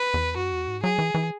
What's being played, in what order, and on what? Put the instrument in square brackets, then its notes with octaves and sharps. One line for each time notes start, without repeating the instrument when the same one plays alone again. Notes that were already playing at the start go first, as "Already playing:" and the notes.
Already playing: [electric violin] B4
[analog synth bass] E2
[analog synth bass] F#2 [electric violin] F#4
[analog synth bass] E2
G#2
[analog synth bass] F#3 [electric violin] G#4
[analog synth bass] E3
E3